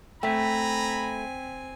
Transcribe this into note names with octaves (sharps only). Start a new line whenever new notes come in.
A3 C4 G5 G#5 A#5 B5 B6